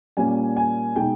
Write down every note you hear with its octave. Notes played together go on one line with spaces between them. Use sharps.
A#2 G3 A#3 C#4 G#5
G#5
B2 G#3 D#4 G5